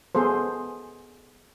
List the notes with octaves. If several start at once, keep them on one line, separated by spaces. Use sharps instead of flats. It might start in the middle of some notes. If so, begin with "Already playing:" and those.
B3 G#4 A4 C5